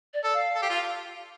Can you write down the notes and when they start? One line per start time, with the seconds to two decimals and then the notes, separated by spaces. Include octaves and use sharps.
0.14 D5
0.24 A4
0.34 F5
0.55 A4
0.62 G4
0.70 F4